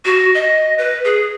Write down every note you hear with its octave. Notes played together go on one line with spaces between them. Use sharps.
F#4
D#5
B4
G#4